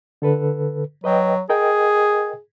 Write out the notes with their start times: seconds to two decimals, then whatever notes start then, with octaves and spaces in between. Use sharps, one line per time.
0.22 D3 A4 B4
1.04 F#3 B4 D#5 G5
1.50 G#4 A#4 D#5 G5